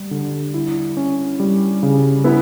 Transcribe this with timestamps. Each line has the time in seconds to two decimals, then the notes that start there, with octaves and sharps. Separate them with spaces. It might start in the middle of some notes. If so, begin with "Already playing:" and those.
Already playing: G3
0.11 D3
0.54 E4
0.97 C#4
1.40 G3
1.83 C#3
2.24 B3 E4